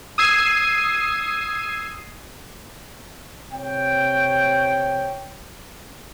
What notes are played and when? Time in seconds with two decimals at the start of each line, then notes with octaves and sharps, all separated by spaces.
0.18 D#6 E6 G#6 C7 D#7
3.53 C3 C#5 G5